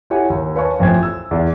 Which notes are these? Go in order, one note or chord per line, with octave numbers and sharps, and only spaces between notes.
E4 G4 A4 C#5 F#5 G#5
D#2
B4 C#5 F5 G#5 A5 C#6
A1 F2 C5 G#5 G#6
E6
E2